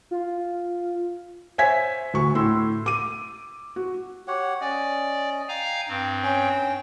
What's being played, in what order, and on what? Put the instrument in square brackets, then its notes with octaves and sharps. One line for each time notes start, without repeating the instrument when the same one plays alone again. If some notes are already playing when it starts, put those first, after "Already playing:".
[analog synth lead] F4
[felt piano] C5 C#5 E5 G#5 G#6 B6
D2 C#6
A2 C6 E6
D6 D#7
F#4
[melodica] G4 C#5 F#5
[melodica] C#4 D#5 [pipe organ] D5
[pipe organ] F5 G#5 A#5 [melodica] G5
[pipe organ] G2 C4
[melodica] C#4 G5